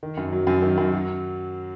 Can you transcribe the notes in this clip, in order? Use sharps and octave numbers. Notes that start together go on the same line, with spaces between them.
D#3
F#2
F#3
F#2
D#3
F#2
F#3